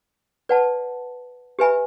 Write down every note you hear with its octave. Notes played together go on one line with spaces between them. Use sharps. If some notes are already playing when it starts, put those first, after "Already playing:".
B4 D5 F#5 A5
G4 B4 E5 G#5 B5